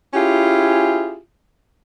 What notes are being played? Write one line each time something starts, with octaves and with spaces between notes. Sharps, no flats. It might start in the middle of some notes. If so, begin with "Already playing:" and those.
C#4 E4 F4 G4 G#4